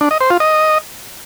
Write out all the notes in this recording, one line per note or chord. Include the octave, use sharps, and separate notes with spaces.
D4
D#5
C5
F4
D#5